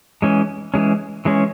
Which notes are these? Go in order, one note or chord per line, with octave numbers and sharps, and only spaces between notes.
E3 G#3 C#4
E3 G#3 C#4
E3 G#3 C#4